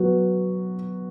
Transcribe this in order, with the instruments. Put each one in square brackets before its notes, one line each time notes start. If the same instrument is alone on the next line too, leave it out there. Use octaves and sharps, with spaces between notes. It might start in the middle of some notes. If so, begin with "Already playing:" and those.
Already playing: [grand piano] F#3 B3 F#4